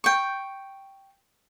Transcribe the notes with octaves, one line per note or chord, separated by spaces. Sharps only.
G5 C#6